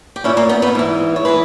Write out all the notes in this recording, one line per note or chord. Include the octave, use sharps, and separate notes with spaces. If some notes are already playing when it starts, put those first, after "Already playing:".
G4
A#2 C#4 E4
A#3 C#4
B3 D#4
B3 D#4
G#2 E3
C#5
E3 G#4 B4